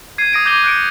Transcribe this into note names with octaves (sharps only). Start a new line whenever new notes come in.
G#6 C7 D#7
D#6 A#6 D7
D6 G6 G#6 A#6 D#7 G7
F#6 G6 C#7 D7